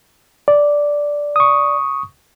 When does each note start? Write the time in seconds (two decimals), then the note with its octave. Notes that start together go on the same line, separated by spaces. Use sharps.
0.48 D5
1.36 C#6 D#6